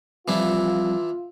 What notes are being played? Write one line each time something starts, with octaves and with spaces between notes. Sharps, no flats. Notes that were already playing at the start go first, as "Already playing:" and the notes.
E3 F3 G3 C4 D4 E4 F4